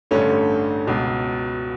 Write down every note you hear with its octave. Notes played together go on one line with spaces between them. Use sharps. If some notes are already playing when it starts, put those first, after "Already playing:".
A1 G2 D3 A3 C#4
C#2 B2